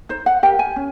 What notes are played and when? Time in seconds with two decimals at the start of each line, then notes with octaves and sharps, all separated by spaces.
0.09 D#4 C5
0.26 F#5
0.43 G4 A#4 G5
0.59 G#5
0.76 C#4